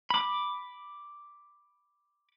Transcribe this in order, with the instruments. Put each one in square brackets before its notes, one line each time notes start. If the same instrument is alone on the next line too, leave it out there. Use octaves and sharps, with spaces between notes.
[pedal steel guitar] B5 D6